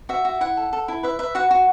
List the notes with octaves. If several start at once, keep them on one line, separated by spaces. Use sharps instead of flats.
F#4 E5
F#4
E4 F#5
A4
A4
E4
B4 E5
B4 E5
F#4 F#5
F#4